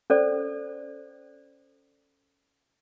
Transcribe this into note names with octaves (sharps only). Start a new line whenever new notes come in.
C#4 A4 C5 D5